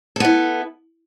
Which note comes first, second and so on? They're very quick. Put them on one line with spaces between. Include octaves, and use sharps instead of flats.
A4 B3 E4